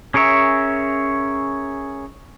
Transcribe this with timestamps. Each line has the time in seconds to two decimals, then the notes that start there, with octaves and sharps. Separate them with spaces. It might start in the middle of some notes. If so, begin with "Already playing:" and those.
0.14 C#4 G#4 A#4 C#5 E5